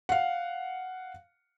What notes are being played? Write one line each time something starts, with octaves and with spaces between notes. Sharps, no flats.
F5 F#5